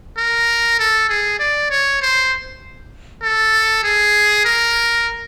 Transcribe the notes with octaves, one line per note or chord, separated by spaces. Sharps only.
A#4
A4
G#4
D5
C#5
C5
A4
G#4
A#4